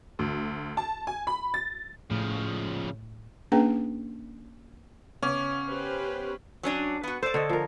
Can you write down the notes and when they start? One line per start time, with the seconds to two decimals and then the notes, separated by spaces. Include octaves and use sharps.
0.19 D2
0.77 A5
1.07 G#5
1.27 B5
1.54 A6
2.11 A2 C#3 F3
3.52 A#3 C#4 D4 G#4 B4 G5
5.23 C#3 B3 C#4 C#5 D6
5.68 G4 B4 C5
6.63 F#3 C#4 D4
7.03 B3 F#4
7.23 A4 C5 D5
7.34 D3 C#5 D#5
7.49 F3 A#4